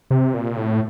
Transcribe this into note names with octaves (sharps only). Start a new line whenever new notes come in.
C3
A#2
A2